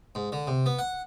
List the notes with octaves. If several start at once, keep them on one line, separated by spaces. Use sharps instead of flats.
G#2
D3
C3
B3
F#5